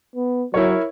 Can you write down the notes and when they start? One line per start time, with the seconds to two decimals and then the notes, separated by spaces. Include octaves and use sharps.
0.16 B3
0.54 F#3 E4 A#4 C#5